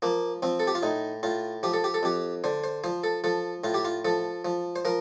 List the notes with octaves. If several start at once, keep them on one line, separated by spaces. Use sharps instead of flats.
F3 A#3
F3 C4
A4
G4
F4
A2 D#4
A2 F4
F3 G4
A4
G4
A4
F2 G4
D3 C5
C5
F3 C5
A4
F3 A4
A2 F4
G4
F4
F3 A4
F3
C5
F3 A#4